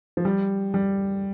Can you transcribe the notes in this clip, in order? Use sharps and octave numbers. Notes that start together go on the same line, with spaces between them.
F3
G3
G3